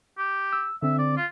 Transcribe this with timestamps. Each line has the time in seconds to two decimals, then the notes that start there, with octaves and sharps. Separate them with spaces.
0.18 G4
0.53 E6
0.82 D3 C4 E5
0.99 D5
1.17 F4